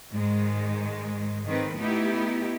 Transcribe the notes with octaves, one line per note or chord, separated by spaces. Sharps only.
G#2 D#3 G#3
G#2 D#3 C4 B4
A3 B3 D#4 E4 G4